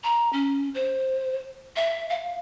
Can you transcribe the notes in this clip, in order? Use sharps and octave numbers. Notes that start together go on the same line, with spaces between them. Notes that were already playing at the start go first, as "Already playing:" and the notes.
A#5
C#4
C5
E5
F5